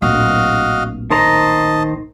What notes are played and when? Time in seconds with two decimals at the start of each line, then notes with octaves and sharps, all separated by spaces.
0.02 D1 A#1 F#4 D#5 F5
1.11 D#3 C5 D#5 A5 A#5